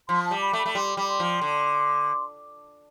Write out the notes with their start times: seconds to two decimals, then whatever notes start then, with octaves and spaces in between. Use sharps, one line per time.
0.09 F3 C6
0.26 A5
0.31 G3
0.41 B5
0.53 A3
0.59 B5
0.66 A3
0.75 G3 C6
0.97 G3 B5
1.08 C6
1.20 F3
1.41 D3